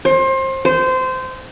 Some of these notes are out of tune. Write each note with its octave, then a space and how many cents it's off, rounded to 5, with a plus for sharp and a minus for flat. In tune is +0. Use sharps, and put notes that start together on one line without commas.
C5 +30
C5 -20